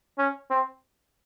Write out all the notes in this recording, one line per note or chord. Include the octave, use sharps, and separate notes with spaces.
C#4
C4